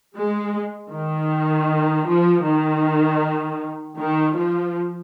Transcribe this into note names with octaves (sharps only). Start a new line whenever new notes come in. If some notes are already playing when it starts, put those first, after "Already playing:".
G#3
D#3
F3
D#3
D#3
F3